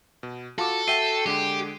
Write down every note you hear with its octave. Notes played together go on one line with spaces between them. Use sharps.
B2
F4 F#4 A4 D6
F#4 E5 G5 C7 D#7 G7
D3 G#3 G4